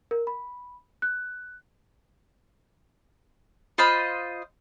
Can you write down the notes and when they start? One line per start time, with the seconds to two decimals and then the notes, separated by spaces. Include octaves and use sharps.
0.11 A#4
0.27 B5
1.02 F#6
3.78 F4 C5 D#5 B5